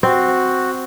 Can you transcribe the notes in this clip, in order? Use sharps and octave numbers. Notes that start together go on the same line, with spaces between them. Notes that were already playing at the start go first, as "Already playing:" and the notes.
C4 F#4